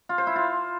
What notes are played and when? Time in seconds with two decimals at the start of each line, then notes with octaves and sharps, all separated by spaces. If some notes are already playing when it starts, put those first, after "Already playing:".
0.09 F4
0.18 C5
0.27 E4
0.36 F4